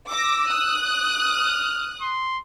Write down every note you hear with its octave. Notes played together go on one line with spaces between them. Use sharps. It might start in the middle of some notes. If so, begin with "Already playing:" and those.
D6 E6 A#6
D#6 F#6
F6
C6